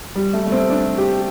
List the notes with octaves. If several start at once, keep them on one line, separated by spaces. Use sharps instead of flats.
G3
A3
A3
C4
D4
G4